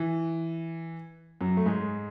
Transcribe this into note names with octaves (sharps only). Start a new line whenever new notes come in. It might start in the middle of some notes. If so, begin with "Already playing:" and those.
Already playing: E3
F#2 F#3
A3
G#2 G#3